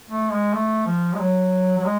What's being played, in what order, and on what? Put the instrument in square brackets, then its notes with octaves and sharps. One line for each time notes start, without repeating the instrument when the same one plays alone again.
[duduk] A3
G#3
A3
F3
G#3
F#3
F#3
G#3